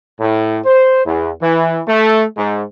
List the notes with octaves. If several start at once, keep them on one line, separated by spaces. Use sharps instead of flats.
A2
C5
E2
E3
A3
G#2